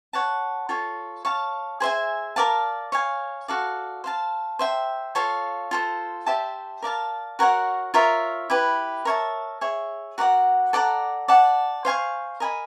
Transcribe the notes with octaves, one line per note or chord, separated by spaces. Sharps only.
C#5 F#5 A5
F4 A4 C#5
C#5 F5 A5
G#4 C5 E5 G#5
A#4 D5 F5 A5
C#5 F5 G#5
F#4 A4 D5 F5
C5 F5 A5
C5 E5 G5
F4 A4 C#5 F5
F4 A4 C5
G4 C5 E5 A5
A#4 D5 F5 A5
F#4 A#4 C#5 F#5
F4 A#4 C#5 E5
E4 G4 B4
A#4 C#5 E5 A5
G#4 C#5 E5
F#4 A#4 D5 F#5
A4 D5 F#5 A#5
D5 F#5 A5
C5 F5 G#5 C#6
A#4 D#5 G#5 B5